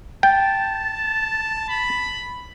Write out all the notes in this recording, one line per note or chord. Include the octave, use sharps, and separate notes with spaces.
G5 A5 A6
B5